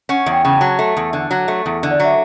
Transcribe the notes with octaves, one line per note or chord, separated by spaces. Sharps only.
C#4 F#5
E2
G5
C#3 G5
A5
F#3
A3
E2
D3
F#3
A3
E2
D3
D5
F#3 E5